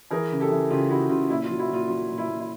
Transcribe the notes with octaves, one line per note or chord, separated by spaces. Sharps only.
E3 G#4 A#4
C#3
G4 A4
E3
C#3 F4 G4
C#3 E4 F#4
C#3 F4
A#2 E4
F4
F#3
E4 F#4
A#2
F4
F#3 F4
A#2
E4
A#2
E4